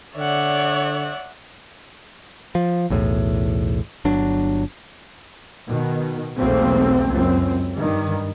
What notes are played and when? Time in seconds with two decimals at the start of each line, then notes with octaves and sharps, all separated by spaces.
0.17 D3 C#5 D5 E5 F#5
2.55 F3
2.90 B1 E2 A2
4.05 G1 F#3 D4
5.67 B2 D#3
6.38 B1 E2 A3 A#3 C4
7.09 C#2 F#2 C4
7.76 G2 D#3